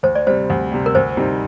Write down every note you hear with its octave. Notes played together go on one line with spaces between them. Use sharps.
D2 C5
D5
C3 G3 C5
D2
C3 G3
A#4
D2 C5
C3 G3 C4 D#4